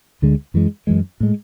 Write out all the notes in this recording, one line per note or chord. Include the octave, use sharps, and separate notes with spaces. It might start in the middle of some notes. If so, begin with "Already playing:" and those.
D2 D3 G#3
F#2 E3 G#3
F#2 E3 G#3
A2 G#3